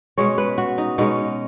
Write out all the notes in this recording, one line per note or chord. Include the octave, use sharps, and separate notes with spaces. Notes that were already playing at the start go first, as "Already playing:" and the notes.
B2 G#3 C#4 C#5
B4
F#4
D#4
B2 G#3 C#4 D#4